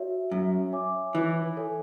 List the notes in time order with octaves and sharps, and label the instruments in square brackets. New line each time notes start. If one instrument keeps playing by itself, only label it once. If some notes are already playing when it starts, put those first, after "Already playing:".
Already playing: [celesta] F#4 C#5 E5
[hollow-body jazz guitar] F#2
[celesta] C#5 E5 G#5 D6
[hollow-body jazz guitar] E3
[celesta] A4 C#5 G#5